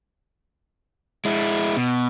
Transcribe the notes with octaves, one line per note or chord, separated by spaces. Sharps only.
G#3 E4
B2